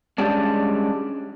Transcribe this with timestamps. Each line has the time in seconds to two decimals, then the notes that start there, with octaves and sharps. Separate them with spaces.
0.18 G3 G#3 C#4 D4